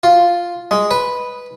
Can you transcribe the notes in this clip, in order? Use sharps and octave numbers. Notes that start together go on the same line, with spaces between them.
F4
G#3
B4